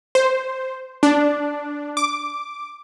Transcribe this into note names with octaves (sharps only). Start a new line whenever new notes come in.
C5
D4
D6